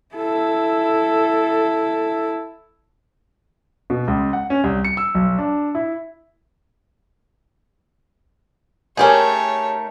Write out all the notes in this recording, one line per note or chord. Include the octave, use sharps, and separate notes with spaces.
E4 A4
B2
C#2
F#5
C#4
C2
C#7
E6
B1
D4
E4
A3 C#4 D#4 G4 G#4 A#4 C#5 A5